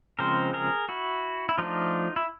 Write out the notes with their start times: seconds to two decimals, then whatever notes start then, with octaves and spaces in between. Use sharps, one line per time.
0.19 C#3 F3 G#3 C4 A#4 C5
0.53 G#4 A#4
0.89 E4 F#4
1.49 E4
1.58 F3 A3 D4 D#4 F4
2.16 E4